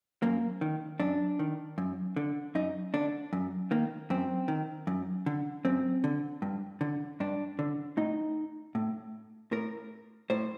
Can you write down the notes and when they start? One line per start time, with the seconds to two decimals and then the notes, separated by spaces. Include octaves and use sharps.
0.22 F#2 A#3
0.61 D#3
1.00 F#2 D4
1.39 D#3
1.78 F#2
2.16 D3
2.55 F#2 D#4
2.94 D3 D4
3.33 F#2
3.71 D#3 A#3
4.10 F#2 C4
4.48 D#3
4.87 F#2
5.26 D3
5.65 F#2 C4
6.04 D3
6.42 G2
6.81 D3
7.20 G2 D4
7.59 D3
7.97 A2 D#4
8.75 A2
9.52 A2 A#4
10.30 A2 C5